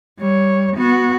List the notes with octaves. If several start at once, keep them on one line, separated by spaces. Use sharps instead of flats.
G3 C#5
B3 F#4